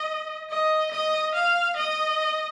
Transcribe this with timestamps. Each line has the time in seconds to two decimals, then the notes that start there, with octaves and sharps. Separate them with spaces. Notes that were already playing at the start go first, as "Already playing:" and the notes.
Already playing: D#5
0.50 D#5
0.91 D#5
1.35 F5
1.76 D#5